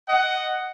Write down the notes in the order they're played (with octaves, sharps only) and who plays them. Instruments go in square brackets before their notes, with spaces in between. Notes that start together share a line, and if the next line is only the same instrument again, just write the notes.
[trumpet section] D#5 F#5